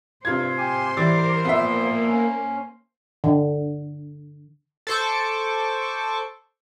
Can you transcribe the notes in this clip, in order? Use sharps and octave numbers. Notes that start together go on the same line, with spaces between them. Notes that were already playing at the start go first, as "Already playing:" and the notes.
G2 C3 F4 C5 G#6
G4 G#5 C6
E3 G3 A#4 D6 A6
A#2 F3 A#3 B3 E5
C#4
D3
A4 C5 C#6 D6